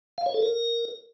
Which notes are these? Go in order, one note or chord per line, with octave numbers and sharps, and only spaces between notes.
F5
C#5
A4
A#4